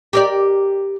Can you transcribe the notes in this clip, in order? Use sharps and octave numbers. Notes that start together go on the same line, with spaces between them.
G4 A#4 D5